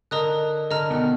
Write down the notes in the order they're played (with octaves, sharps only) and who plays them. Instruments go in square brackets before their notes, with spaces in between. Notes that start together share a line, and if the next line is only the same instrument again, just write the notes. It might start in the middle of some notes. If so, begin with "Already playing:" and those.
[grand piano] D3 [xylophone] A#4 D#5 A#5 D#6 F#6
[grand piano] D3 [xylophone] D#5 A#5 F6
[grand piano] B2 D#3